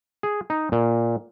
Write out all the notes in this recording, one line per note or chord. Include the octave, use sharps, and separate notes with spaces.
G#4
D#4
A#2